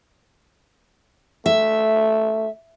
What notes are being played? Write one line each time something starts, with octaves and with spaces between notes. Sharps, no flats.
A3 E5